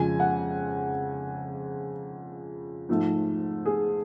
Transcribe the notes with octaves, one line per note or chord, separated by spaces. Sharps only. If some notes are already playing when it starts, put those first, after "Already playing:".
Already playing: F2 C#3 F3 G#3 G#5
F#5
G#2 F3 A3
G#4